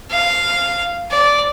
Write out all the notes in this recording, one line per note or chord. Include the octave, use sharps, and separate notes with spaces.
F5
D5